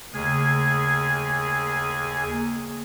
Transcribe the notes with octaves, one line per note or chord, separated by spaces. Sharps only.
D#2 C#3 A3 G#4 G#5
A#3 G#4